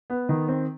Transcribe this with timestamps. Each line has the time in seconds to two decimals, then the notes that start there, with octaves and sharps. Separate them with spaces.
0.10 B3
0.29 D#3
0.48 C4